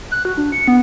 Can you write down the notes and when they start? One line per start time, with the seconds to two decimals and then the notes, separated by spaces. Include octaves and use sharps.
0.11 F#6
0.25 F#4
0.37 D4
0.52 C#7
0.68 B3